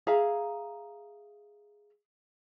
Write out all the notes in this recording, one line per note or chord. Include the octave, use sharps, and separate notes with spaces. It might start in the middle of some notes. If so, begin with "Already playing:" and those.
G#4 E5 F5 A#5